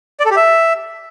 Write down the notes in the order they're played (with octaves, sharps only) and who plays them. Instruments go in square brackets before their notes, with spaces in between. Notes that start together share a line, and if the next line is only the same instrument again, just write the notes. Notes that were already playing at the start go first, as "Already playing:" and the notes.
[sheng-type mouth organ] D5
A4
G4
E5